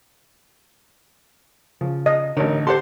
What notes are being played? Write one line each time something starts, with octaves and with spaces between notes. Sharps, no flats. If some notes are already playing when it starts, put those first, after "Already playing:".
C#3 F3
D#5
A1 D3 D#4 A#4 B4 C#5
G4 A4 C5 F#5 C6